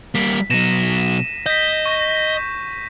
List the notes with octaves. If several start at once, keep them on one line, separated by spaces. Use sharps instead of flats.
G3 A#3 B6
B2 F#3 A#6 D#7 E7
D#5 G6 B6
C#6 A#6